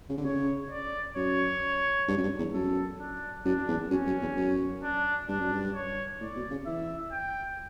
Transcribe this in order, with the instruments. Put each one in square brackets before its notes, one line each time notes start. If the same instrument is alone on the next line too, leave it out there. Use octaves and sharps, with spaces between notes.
[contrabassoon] C#3
D3
[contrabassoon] C#3 [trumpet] C#5
[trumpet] D5
[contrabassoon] F#2 [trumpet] C#5
[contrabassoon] G2
F#2
G2
E2
[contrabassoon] F#2 [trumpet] A4
[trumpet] D4
[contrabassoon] F#2 [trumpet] D4
[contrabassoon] E2
[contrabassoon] F#2 [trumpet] C#4
[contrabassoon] F#2
E2
F#2
[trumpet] D4
[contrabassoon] G2 [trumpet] D4
[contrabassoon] F#2
G2
[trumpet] C#5
[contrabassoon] A2 [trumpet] D5
[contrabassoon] B2
C#3
[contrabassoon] E3 [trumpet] E5
[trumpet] G5